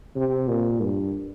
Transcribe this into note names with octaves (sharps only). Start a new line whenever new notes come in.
C3
A#2
G2